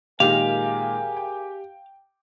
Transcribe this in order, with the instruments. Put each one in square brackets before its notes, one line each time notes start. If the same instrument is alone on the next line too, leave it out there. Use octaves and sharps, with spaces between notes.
[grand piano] A#2 D#3 G#3 [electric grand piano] G4 [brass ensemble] G#4 A#4 G#5 [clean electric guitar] F5
[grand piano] G5